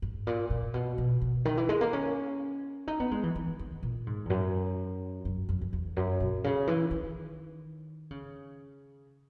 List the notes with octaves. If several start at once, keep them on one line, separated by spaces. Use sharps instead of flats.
G#2
A#2
A#2
B2
B2
B2
D#3
E3
G#3
A#3
C#4
D#4
B3
G#3
E3
E3
D#3
A#2
G#2
E2
F#2
F#2
F#2
F#2
E2
F#2
A#2
C#3
E3
D#3
C#3